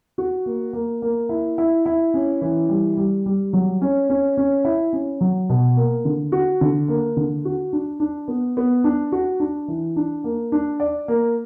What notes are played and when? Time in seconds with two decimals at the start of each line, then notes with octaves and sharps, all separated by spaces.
0.18 F#4
0.46 A#3
0.73 A#3
1.02 A#3
1.29 E4
1.58 E4
1.86 E4
2.14 C#4
2.41 E3
2.69 G3
2.97 G3
3.26 G3
3.53 F#3
3.82 C#4
4.10 C#4
4.37 C#4
4.65 E4
4.93 C#4
5.21 F#3
5.49 B2
5.76 A#3
6.05 D3
6.32 F#4
6.61 D3
6.88 A#3
7.17 D3
7.45 F#4
7.73 D4
8.00 D4
8.28 B3
8.57 B3
8.84 D4
9.12 F#4
9.40 D4
9.68 E3
9.96 D4
10.24 A#3
10.52 D4
10.80 D5
11.08 A#3